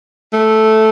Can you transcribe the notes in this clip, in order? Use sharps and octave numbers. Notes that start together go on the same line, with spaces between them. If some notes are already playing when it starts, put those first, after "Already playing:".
A3